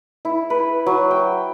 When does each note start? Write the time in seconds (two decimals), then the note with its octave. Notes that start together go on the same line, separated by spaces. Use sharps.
0.25 E4
0.50 B4
0.86 F#3
1.11 G5